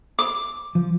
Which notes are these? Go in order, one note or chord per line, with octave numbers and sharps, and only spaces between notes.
D6
F3